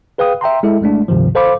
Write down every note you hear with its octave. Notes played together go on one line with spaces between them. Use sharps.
G#4 B4 F5 G5 D#6
E5 G5 A#5 C6
G#3 E4 A4 E5
G#1 G#3 A3 D4
C#2 G2 C3 D#3 F3
A4 C5 F5 B5 D6